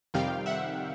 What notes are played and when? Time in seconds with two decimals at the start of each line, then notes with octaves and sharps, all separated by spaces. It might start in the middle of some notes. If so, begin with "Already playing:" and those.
0.14 F2 C3 D#3 G3 F5 G5
0.46 E5 F#5